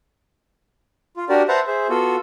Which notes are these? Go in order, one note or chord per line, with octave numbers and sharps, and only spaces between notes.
F4
D4 F#4 G4 A#4 D5
B4 C5 E5 F#5 A5 A#5
G#4 C5 E5
B3 F4 F#4 A4